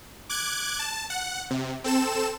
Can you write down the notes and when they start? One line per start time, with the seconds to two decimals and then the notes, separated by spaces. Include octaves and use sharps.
0.29 D6 F#6 G#6
0.79 A5
1.10 F#5
1.51 C3
1.84 C4 A4 E7